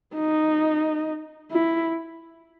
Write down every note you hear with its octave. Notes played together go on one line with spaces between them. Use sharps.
D#4
E4